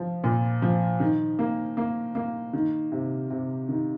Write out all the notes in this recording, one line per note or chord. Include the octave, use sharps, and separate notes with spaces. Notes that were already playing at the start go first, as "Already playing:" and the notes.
Already playing: F3
A#2
F3
D#3
A#3
A#3
A#3
D#3
C3
C3
D#3